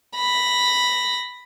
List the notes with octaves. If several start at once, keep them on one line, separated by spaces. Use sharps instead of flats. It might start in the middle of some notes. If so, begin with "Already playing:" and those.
B5 A#6